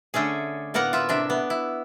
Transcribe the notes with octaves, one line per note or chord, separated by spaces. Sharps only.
D3 A3 C#4 G#4
A2 A#3 B3 A#4 F#5 A#5
F4 E5
C3 D4 E5
B3
E4